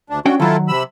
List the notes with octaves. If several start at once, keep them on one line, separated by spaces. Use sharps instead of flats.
D2 D4
C#4 D4 F#4 G5
D#3 F#3 E4 F4 A4
C3 B5 E6